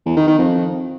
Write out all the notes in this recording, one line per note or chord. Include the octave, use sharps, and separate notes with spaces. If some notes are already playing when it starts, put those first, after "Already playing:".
E2
D#3
D#3
F2